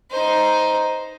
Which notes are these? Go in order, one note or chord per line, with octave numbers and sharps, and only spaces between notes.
D#4 C5